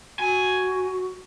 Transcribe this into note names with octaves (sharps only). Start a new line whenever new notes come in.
F#4 G#5